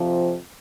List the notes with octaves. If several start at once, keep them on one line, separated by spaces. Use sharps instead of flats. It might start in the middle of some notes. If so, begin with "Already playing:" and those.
Already playing: F2 C3 F3